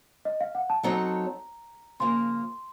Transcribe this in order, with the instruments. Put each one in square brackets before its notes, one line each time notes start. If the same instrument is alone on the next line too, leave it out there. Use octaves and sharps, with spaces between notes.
[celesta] D#5
F5
F#5
A5
[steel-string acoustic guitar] F#3 C4 D#4 A4 C#5 [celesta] A#5
[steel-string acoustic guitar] C#3 F3 A#3 [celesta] C6